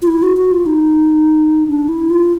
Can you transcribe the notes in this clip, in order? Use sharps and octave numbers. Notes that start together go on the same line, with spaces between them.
F4
E4
F#4
F#4
F4
D#4
D4
E4
F4